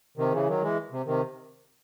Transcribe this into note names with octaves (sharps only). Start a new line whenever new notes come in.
C3 D#3
C#3 E3
D#3 F#3
E3 G#3
C3
C3 D#3